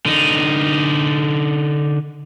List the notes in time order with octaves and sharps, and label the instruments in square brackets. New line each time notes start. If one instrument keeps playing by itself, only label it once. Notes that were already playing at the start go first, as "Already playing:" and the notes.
[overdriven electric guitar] D3 D#4